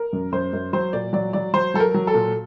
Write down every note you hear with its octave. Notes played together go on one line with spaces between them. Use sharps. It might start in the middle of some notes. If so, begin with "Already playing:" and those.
Already playing: A#4
F#2
F#2 C5
F#2
F#3 C5
A#2 D5
F#3 D5
F#3 D5
F#3 C5
F#3 A4
A#4
F#3
A4
A#2